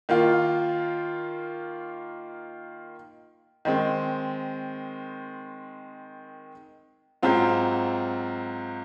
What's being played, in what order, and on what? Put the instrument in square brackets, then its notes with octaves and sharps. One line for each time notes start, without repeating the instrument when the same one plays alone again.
[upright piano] D#3 A#3 F4
D#3 G#3 C4
G#2 F#3 C4 F4